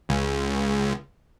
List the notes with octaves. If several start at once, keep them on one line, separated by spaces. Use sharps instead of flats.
C#2